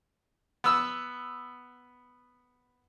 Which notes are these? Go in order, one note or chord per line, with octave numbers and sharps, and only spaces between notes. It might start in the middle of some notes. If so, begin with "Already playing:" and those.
B3 E6